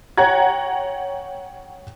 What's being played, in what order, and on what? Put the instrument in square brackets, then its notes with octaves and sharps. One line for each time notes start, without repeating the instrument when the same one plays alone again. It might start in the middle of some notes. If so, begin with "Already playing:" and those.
[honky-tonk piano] C#5 F#5 G5 A#5 G#6